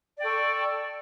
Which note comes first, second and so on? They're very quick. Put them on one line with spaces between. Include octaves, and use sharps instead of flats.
D5 G5 A4 C#6